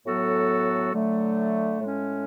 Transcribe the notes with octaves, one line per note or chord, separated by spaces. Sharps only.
A2 F#3 B3 F#4 A4
D3 F#3 A3
A2 G#3 C#4